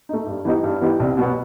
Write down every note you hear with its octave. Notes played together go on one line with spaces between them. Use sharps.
A3 D#4
G2
E3 B3 D#4 G4
G2
E3 B3 D#4 G4
C2
B2 F#3 B3